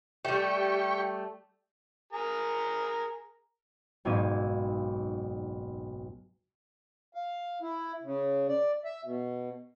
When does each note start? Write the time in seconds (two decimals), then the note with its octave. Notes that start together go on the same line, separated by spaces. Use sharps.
0.25 G3 A3 G4 C#6
2.13 G#4 A#4 A#5
4.05 F#1 B1 G#2 F5 G#6 D#7
7.14 F5
7.62 E4
8.03 C#3
8.48 D5
8.84 E5
9.04 B2